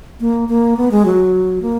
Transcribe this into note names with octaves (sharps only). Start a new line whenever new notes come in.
A#3
A#3
B3
G#3
F#3
A#3